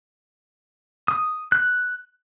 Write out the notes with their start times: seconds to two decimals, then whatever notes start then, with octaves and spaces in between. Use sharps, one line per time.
1.08 D#6
1.52 F#6